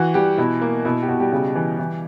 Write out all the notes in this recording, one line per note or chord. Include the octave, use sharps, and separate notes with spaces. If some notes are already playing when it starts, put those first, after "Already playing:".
Already playing: E3 F#4
E3 G3 G4
B2 E4
A#3
B2 E4
G4
B2 F#4
G3 G4
C#3
E3
E3